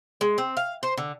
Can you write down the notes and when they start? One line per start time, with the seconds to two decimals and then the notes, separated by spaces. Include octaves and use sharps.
0.21 G#3
0.38 C4
0.57 F5
0.83 C5
0.97 D3